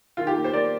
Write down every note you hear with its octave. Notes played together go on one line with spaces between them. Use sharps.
D#3 F4
G4
A#3
C5
A#3 D5